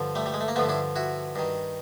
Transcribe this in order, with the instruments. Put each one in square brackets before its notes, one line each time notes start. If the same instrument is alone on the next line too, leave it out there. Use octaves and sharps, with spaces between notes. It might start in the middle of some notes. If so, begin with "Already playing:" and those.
Already playing: [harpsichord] G2 D3 F3
G3 A3
G3
G#3
A3
A#3
G2 D3 F3 A3 B3
D4 E4
E4 F#4
G2 D#3